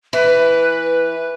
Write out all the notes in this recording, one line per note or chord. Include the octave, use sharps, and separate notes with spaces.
E3 B4